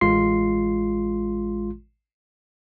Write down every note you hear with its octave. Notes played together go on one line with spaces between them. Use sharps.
A1 G#3 F4 C6 C7